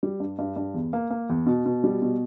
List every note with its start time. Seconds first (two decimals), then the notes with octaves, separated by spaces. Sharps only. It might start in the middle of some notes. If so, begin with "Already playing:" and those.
0.03 G3
0.20 G2
0.39 G2
0.56 G2
0.74 E2
0.93 A#3
1.10 A#3
1.29 E2
1.46 B2
1.66 B2
1.84 G3
2.02 B2